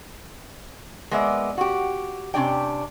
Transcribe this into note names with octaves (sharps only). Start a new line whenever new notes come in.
G#3 A#3 B3 D5 E5
F#4 G4
C3 C#4 D4 G4 D5 G5